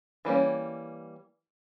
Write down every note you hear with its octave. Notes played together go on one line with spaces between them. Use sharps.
E3 G3 A#3 C#4